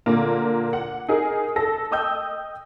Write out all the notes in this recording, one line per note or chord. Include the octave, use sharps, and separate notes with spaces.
A#2 D3 A#3
F#5
D#4 G#4 A#4
A4 A#6
D#5 G5 D#6 E6 G6